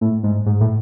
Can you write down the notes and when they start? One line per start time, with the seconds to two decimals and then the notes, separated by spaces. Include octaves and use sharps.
0.01 A2
0.23 G#2
0.46 G#2
0.61 A2